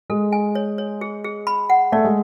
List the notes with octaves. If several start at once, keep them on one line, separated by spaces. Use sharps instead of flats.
G#3 A4
G#5
C#5
C#5
G#4
G#4
B5
F#5
A3 D5
G#3